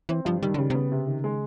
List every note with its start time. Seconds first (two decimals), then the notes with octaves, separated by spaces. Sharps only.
0.09 E3 C4
0.25 G2 F3
0.42 D#3 G3
0.54 D3
0.58 C#3 G3
0.70 C3
0.74 C#3 B3
0.92 C3
1.07 D#3
1.24 G#3